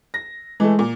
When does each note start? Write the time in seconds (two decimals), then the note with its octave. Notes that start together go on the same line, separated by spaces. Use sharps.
0.14 A#6
0.60 E3 G#3 A3
0.79 A#2